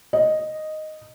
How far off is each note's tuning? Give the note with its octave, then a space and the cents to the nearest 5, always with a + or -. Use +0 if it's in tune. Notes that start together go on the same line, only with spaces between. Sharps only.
D#5 -5